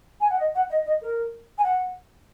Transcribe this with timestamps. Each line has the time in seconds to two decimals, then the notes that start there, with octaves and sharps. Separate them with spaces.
0.20 G#5
0.30 F#5
0.39 D#5
0.55 F#5
0.70 D#5
0.86 D#5
1.02 A#4
1.58 G#5
1.64 F#5